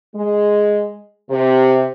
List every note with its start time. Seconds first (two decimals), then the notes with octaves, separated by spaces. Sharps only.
0.15 G#3
1.30 C3